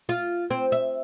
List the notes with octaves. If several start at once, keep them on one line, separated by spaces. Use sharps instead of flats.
F4
C4
E5